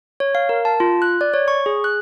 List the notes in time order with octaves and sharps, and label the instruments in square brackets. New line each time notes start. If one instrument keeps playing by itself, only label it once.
[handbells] C#5
F5
A#4
A5
F4
F#6
D5
C#5
C#6
G#4
F#6